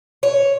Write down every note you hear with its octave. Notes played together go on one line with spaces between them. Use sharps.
C#5